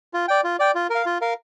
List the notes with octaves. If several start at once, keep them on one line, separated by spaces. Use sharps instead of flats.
F4
D5 G5
F4
D5 G5
F4
A#4
F5
F4
A#4 F5